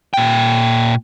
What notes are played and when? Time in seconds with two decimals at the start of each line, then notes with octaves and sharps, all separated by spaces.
0.14 A#2 G5